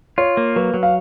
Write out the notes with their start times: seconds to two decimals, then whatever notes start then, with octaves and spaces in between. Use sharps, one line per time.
0.18 F4 C#5
0.37 A#3
0.56 F#3 B4
0.74 F#3
0.83 F5